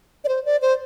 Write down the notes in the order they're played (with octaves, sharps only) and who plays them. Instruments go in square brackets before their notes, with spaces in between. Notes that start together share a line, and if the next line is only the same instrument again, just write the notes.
[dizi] D5
C5
D5
C5